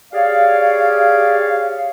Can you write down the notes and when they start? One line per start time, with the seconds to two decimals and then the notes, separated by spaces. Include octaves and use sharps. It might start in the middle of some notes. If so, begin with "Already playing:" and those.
0.13 G4 G#4 C#5 D5 F5